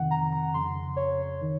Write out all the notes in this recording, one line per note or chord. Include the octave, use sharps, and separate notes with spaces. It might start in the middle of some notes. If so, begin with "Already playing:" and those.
Already playing: F2 C3 D#3 F#5
A#5
A#5
F2 C#3 C6
C#5
D#3